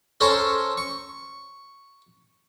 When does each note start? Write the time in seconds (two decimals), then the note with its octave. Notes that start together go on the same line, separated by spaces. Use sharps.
0.21 C#4 A4 A#4 C5 C#5
0.77 C#6